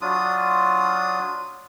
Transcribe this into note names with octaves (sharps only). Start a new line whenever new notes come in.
F#3 D4 F4 D#6